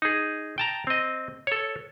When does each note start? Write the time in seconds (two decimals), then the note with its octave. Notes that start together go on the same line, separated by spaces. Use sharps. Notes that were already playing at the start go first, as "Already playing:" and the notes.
0.02 D#4 G#4
0.58 G5 A5 A#5
0.87 C4 D#5
1.47 A4 C#5